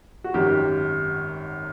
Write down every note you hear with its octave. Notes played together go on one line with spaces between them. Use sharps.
F#4
G#1 F#2 D#3 F#3 G4